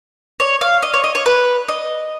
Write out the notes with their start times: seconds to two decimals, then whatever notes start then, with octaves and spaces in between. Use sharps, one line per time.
0.40 C#5
0.61 F5
0.82 D#5
0.94 C#5
1.04 D#5
1.15 C#5
1.26 B4
1.68 D#5